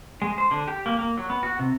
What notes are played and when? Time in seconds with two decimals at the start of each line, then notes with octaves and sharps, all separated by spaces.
0.22 G#3
0.38 C5
0.51 D3
0.68 G4
0.86 A#3
0.99 A#3
1.17 F#3
1.30 B3
1.43 F#4
1.59 C3